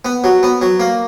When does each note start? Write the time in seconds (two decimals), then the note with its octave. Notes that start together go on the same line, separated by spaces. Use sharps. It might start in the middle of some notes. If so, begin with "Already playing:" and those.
0.05 B3
0.24 F#3
0.43 B3
0.62 F#3
0.80 A#3